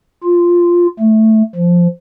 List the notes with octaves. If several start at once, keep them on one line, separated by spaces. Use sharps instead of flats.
F4
A3
F3